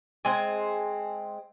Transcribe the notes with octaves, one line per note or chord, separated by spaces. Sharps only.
G#3 C4 G#5